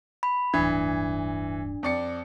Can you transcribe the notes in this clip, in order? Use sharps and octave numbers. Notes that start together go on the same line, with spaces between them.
B5
D1 G2 E3 D4
F2 D5 C#7